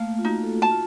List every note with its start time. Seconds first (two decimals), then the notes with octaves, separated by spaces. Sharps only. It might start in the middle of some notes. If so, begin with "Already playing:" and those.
Already playing: A3 A#3 F5
0.19 F4
0.25 D#4 F#4
0.43 A4
0.62 F#4 A5
0.71 F4